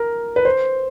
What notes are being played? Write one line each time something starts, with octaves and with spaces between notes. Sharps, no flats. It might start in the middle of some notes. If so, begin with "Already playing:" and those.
Already playing: A#4
B4
C5